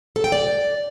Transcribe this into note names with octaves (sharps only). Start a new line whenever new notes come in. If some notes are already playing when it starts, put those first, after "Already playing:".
A4
G5
D5